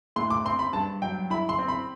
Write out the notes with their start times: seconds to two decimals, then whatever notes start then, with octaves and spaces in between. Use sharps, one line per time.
0.16 A2 C6
0.30 D6
0.45 C4 C6
0.59 B5
0.73 G2 A5
1.02 F#3 G5
1.30 E4 B5
1.49 C6
1.59 C4
1.68 B5